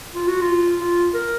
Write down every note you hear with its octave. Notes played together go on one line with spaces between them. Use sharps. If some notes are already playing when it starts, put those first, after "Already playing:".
F4
F#4
F4
F4
A#4